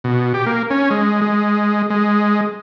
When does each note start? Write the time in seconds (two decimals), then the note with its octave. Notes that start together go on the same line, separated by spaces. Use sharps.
0.04 B2
0.34 G4
0.46 A#3
0.70 C#4
0.90 G#3
1.22 G#3
1.90 G#3